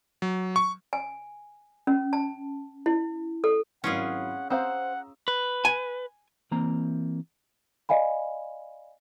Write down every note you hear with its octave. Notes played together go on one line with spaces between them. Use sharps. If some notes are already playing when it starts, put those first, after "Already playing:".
F#3
C#6
G#5
C#4
A5
E4
A4
G#1 F#3 C#4 E4 F4 G#4 F#5
C4 C5 F5 F#5 A#5 D#6 E6
B4
G#5
E3 A#3 C4 A#5
D5 D#5 F5 G#5 B5